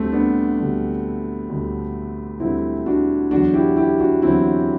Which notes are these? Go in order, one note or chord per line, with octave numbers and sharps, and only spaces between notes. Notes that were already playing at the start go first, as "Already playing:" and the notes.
Already playing: D2 D3 G3 A3 C4
B3 D4
D2 D3 G3
D2 D3 G3
D2 D3 G3 C4 E4
D4 F#4
E2 D3 F#3 D4 F#4
E4 G4
E4 G4
D4 F#4
E2 D3 F#3 C4 E4